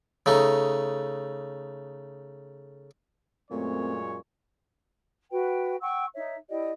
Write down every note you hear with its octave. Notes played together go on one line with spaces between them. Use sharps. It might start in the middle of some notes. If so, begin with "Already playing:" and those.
C#3 A3 D#4
F#2 A#2 G#3 A3 C4 C#5
F#4 B4 G5
F#5 G5 C#6 E6
D#4 C#5 E5
E4 G4 D5 D#5